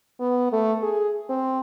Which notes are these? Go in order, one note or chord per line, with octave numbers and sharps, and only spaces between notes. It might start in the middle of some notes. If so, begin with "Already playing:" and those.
B3
A3
G#4
C4